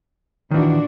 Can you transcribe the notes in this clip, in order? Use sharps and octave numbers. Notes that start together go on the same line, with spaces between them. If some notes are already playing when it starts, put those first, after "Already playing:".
A#2 D#3 E3 D4 F#4